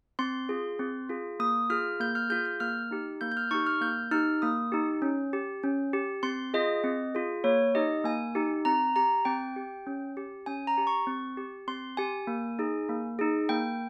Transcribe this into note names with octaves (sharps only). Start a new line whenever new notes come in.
C4 C6
F4 G#4
C4
F4 G#4
A#3 D#6
F4 G#4 F6
A#3 G6
F6
F4 G#4 G6
G6
A#3 F6
D#4 G4
A#3 G6
G6
F6
D#4 G4 C#6
F6
A#3 G6
D#4 G4 F6
A#3 D#6
D#4 G4
C#4
G4
C#4
G4
C4 C6
F4 G#4 D#5
C4
F4 G#4
A#3 C#5
D#4 G4 D#5
A#3 G#5
D#4 G4
C4 A#5
G4 A#5
C4 G5
G4
C#4
G4
C#4 G#5
A#5
G4
C#6
C4
G4
C4 C6
G4 G#5
A#3
D#4 G#4
A#3
D#4 G#4
A#3 G5